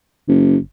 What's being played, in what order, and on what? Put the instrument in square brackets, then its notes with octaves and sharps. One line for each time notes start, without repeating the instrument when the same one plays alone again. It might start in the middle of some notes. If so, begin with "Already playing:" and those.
[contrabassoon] F#1